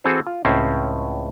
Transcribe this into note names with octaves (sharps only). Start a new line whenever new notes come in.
E3 C4 F#4 G#4 A4 C5
F4
C#2 A2 C4 C#4 C5